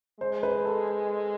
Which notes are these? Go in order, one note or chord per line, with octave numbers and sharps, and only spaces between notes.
G#3 C5
B4
A4